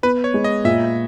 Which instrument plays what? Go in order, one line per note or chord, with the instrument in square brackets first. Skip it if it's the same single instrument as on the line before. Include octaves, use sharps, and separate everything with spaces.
[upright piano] B3 [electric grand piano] B4
[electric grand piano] C#5
[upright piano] G#3
[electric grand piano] D#5
[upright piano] A#2 [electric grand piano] E5